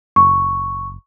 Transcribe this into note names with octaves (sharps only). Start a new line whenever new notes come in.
F#1 C#6